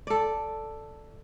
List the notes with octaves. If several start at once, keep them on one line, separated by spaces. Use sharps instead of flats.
A4 D5